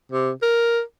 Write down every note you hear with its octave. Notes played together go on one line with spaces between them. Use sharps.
C3
A#4